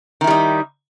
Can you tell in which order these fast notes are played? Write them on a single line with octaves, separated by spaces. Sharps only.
D#3 E4 G3 D#4